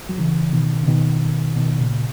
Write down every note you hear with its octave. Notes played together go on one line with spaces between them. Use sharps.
F#3
C#3 E3
B2 D#3
C#3
B2 D#3
B2 D#3
A#2 C#3